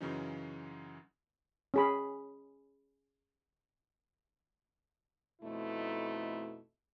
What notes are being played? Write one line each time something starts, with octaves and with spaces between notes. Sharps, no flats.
F#2 C#3 E3 F#3 C#4 D#4
C#4 G#4 B5
F2 B2 A3 D#4 E4